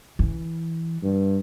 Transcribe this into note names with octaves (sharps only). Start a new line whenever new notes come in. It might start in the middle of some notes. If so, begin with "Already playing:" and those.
E3
G2